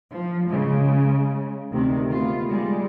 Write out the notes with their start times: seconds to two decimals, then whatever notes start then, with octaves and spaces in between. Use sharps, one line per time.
0.11 F3
0.49 C#3 G#3
1.72 D2 C3 D#3
2.08 A3 B3 F4
2.49 G3 G#3